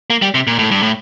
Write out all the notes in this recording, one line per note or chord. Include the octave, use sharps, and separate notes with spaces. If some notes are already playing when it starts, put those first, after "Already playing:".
A#3
G3
C3
A#2
A2
G2
A2